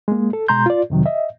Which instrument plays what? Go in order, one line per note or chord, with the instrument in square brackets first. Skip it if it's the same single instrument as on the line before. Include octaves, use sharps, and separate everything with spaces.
[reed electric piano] G#3 A#3
A4
B2 G#3 A#5 C6 G6
F4 D5
F2 C3 D#3 F#3
D#5 E5